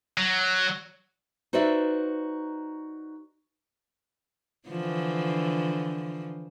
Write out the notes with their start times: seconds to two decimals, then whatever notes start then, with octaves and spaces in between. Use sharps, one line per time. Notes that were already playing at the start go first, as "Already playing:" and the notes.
0.17 F#3
1.53 D#4 F#4 B4 C5 D5 E5
4.69 D3 E3 F3